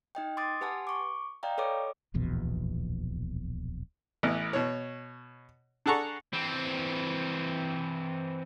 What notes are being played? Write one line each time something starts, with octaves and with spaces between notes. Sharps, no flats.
D#4 D#5 G5
C6 D6 D#6 A6
G4 B4 F#5 G#5 A5 C6
C#6 D6
D5 D#5 F5 G5 A#5
A4 B4 C#5 D#5 D6
D1 A#1 E2 B2
A1 E3 B3 E4 D#5
B2 C#5
D4 G#4 A4 F#5 A#5 C#6
E3 C4